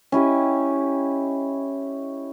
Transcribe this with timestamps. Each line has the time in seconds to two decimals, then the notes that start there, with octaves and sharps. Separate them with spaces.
0.12 C#4 E4 G4 D#5